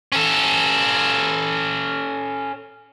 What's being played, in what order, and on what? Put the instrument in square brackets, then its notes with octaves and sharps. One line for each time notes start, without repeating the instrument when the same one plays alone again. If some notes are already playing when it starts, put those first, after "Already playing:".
[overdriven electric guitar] C#4 A4